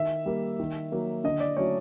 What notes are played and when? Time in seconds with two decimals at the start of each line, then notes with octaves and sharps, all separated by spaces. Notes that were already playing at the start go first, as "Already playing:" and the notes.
Already playing: D#3 E5
0.26 G3 A#3
0.60 D#3
0.92 F#3 A#3
1.24 D3 D#5
1.40 D5
1.57 F#3 A3 C#4 C#5